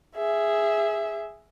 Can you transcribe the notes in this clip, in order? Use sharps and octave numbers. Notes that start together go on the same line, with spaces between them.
G#4 E5